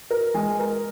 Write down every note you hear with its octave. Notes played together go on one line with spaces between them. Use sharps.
A#4
G#3
A#4